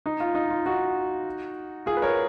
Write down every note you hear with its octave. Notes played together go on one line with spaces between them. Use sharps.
D#4
F4
D#4
F4
D#4 F#4
F4 G#4
B4
A#4 C#5